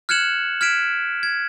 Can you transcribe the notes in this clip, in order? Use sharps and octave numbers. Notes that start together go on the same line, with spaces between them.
F6 F#6 G#6 C#7 E7 F#7
F6 G#6 B6 D7 E7
G#6